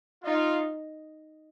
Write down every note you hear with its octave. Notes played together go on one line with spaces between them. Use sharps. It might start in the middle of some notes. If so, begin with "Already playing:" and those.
D#4 F4